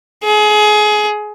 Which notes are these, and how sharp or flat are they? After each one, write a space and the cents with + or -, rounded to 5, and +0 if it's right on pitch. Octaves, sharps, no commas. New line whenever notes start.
G#4 +25